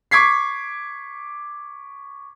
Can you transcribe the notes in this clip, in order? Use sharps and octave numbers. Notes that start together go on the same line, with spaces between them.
C#6 D6 G#6 B6 C7